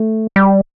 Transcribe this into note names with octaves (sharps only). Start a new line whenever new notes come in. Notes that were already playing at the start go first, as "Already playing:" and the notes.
Already playing: A3
G3